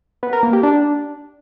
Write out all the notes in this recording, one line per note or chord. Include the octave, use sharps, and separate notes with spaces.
B3
A#4
A#3
G4
D4